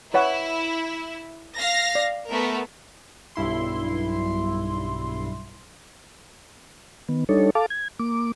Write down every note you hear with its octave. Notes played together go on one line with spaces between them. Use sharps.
E4 B4 C#5 F#5
F5 A#6
D5
A3 B3 A#4
B1 G2 E4 C6
D#3 B3
G3 D4 D#4 A4 C#5
A4 F5 A5 D6
G#6
A#3 D6